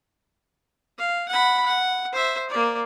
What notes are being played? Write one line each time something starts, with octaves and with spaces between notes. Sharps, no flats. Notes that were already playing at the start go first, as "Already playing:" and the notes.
F5
F#5 B5
F#5
C5 E5
A#3 D5